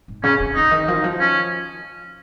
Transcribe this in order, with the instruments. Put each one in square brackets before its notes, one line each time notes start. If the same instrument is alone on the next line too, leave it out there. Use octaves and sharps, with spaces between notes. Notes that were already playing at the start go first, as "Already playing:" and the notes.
[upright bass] G#2
[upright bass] C#3 [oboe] C#4
[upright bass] C#3
[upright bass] C#3 [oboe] D#4
[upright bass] D#3
F3
D#3
F3
[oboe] C#4